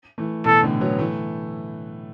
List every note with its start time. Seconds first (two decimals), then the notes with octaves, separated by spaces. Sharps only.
0.18 E3 A3
0.44 B2 E3 A4
0.63 A2 D3
0.81 F#3 B3
0.99 E3 A3